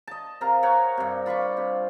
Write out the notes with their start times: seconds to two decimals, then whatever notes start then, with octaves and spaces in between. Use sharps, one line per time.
0.07 D#5 A5
0.41 C3 A#4 F5 A#5
0.63 C#5 F#5 G5 A#5
0.97 G2 C3
1.26 F4 B5 C#6 D6
1.57 C3